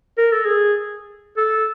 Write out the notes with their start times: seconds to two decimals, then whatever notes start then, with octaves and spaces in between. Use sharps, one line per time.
0.18 A#4
0.32 A4
0.45 G#4
1.37 A4